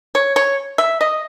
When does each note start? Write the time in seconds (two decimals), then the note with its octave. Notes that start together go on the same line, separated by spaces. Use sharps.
0.15 C#5
0.36 C#5
0.78 E5
1.01 D#5